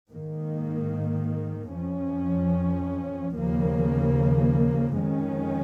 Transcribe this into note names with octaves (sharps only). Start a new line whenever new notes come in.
G#2 D#3 A#3
F2 F3 C#4
D#2 C#3 F3 A#3
F2 D#3 G#3 C#4